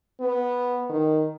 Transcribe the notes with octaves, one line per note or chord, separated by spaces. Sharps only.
B3
D#3